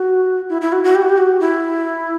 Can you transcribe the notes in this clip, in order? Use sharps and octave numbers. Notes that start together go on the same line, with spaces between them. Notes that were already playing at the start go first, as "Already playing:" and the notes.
Already playing: F#4
E4
E4
F#4
F#4
G4
F#4
G4
F#4
E4